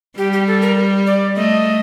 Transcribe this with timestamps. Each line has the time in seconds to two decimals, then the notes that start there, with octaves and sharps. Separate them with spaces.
0.18 G3 G4
0.33 G4
0.47 A4
0.62 A#4
1.07 D5
1.36 A3 D#5